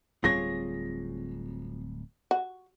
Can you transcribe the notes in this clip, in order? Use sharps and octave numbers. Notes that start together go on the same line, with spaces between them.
D1 G3 C4 F4 G#4 C#5 A#6
F#4